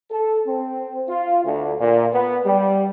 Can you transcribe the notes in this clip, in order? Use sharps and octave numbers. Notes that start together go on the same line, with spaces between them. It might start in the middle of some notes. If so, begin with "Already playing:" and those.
A4
C4
F4
D2
A#2
B3
G3